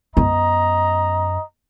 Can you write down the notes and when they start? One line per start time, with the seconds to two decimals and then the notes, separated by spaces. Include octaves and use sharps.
0.17 F#2 B3 D#5 A#5